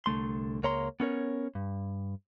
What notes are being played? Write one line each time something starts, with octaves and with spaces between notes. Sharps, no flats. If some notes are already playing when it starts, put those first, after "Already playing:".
C2 D3 A3 C6
C#2 A#3 C#5 A#5 C6
B3 C#4 A#4 C#5
G2